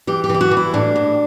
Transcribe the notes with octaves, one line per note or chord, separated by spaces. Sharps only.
E3 G4
G4
E3
E4
F#4
E3
E4
A2 D4
A2